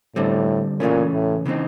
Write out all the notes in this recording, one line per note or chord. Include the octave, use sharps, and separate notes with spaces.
A2 D3 G3 C4
C#2 A#2 C#3 E3 A3 C#4
A2
C#3 E3 G#3 C4 D#4